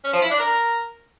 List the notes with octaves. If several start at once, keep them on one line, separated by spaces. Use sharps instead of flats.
C#4
F3
E4
D4
A#4